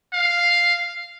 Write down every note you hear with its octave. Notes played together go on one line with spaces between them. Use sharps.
F5